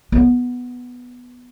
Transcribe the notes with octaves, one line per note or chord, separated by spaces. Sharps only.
B3